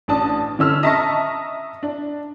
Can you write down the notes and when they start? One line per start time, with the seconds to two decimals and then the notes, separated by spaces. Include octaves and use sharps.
0.08 A1 D4 A5 D#6
0.59 D3 C#4 E6 F6
0.83 D#5 E5 A5 A#5 C#6 A#6
1.83 D4